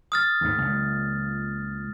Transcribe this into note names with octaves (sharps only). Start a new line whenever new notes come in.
D#6 F6 A6
D#2 G#2
C#2 A#2